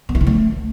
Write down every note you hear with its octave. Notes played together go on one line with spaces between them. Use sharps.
B3
E4
D#3
A3